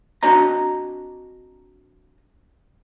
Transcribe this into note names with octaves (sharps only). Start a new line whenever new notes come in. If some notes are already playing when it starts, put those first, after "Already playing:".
C4 D4 F#4 C#5 D#5 A#5